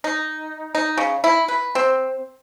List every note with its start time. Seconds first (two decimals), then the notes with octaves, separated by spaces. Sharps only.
0.04 D#4
0.75 D#4
0.97 C#3
1.24 E4
1.48 B4
1.75 C4